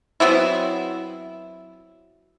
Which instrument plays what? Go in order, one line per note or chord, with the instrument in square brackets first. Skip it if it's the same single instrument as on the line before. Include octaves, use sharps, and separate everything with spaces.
[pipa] F#3 B3 C4 E4